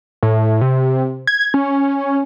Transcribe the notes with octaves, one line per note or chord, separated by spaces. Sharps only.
A2
C3
G#6
C#4